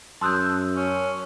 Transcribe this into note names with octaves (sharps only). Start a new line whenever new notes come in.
F#2 A5 C6 D#6 E6 F#6 G6
C#4